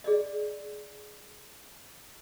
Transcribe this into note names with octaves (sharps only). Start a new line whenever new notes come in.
G#4 D5 D#5